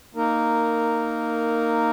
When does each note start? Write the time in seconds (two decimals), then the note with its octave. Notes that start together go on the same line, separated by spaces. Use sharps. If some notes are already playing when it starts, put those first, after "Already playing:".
0.15 A#3 D#4 A#4